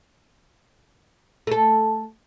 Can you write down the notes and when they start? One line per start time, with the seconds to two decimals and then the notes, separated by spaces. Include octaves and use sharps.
1.47 A3 A4